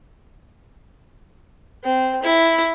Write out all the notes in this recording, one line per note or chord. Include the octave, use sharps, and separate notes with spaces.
C4
E4